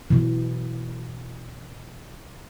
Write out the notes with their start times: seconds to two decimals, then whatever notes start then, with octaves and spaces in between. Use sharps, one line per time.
0.10 B2 E3